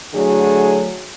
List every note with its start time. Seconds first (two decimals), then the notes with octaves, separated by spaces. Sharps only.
0.14 D3 F#3 A3 E4 F#4 G#4